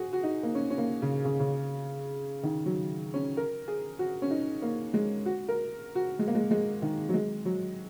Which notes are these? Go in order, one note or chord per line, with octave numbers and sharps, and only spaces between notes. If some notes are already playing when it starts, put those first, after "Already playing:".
Already playing: F#4 G#4
F#4
D#4
A#3
C#4
C#4
A#3
C#3
C#3
C#3
D#3
F#3
C#4
A#4
G#4
F#4
C#4
D#4
A#3
G#3
F#4
A#4
F#4
G#3
A#3
G#3
G#3
D#3
F#3
G#3
F#3